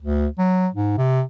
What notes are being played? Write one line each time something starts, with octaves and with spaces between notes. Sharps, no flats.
D2
F#3
G#2
C3